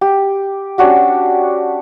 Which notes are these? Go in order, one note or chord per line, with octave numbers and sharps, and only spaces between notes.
G4
C#4 D4 F#4 G4